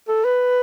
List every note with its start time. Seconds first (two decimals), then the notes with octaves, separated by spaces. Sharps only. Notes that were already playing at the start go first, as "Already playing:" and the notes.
0.08 A4
0.25 B4